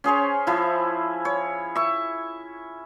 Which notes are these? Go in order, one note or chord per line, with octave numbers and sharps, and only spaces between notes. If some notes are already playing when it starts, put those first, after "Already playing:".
C#4 G#4 C5 C#5
F3 E4
C#5
E5 C#6